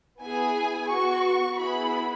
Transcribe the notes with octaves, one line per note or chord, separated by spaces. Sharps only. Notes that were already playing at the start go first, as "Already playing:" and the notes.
B3 E4 G#4 G#5
B3 F#4 C#6
B3 E4 G#4 B5